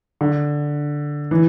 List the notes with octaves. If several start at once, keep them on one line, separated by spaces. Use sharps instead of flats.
D3
E3